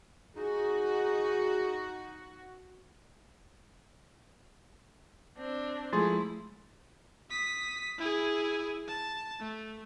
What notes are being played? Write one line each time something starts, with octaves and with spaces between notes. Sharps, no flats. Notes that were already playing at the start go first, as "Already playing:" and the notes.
D#4 F#4 G#4
C4 D4
F3 G#3 A3 E4 G#4 C6 A6
D#6 B6
E4 G#4
A5
A3